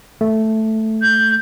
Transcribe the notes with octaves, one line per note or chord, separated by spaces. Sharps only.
A3
G6